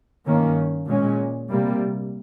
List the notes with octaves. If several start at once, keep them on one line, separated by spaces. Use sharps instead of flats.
G2 D#3 A#3 C#4
A#2 G#3 C#4
C3 G3 A#3